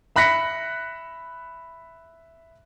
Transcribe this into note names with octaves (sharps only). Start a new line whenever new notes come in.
E5 B5 F#6 A#6 B6 C#7